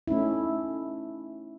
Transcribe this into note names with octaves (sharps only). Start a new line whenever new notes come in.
A3 C#4 D#4 E4